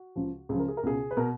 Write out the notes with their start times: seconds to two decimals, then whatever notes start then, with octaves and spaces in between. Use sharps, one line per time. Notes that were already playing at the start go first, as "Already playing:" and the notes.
Already playing: F#4
0.15 C#2 C#3 F3
0.49 C#2 C#3 F3 G#4
0.59 A#4
0.68 G#4
0.77 A#4
0.83 C#2 B2 G#4
1.11 B4
1.17 B2 A#4